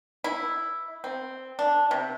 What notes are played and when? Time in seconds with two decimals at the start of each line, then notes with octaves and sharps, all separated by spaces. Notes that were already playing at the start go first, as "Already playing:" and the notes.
0.24 E4
1.04 C4
1.59 D4
1.91 C3